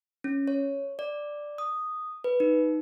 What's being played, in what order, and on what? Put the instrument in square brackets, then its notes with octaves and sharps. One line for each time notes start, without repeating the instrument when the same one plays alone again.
[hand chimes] C#4
C#5
D5
D#6
B4
D#4